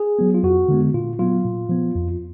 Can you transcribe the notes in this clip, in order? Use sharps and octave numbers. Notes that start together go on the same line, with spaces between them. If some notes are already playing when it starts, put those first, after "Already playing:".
Already playing: G#4
F#3 B3
F4
F2 F#4
D3 G#3 B3
A#2 F4
F#3 B3 F4
A#2
F3 B3
F2